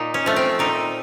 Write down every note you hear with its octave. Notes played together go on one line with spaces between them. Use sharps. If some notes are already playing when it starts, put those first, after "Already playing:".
Already playing: A#2 D#4
C#4
F3 A3
C4
A#2 D#4